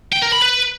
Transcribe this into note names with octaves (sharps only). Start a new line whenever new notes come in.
G5
A#4
B5
B4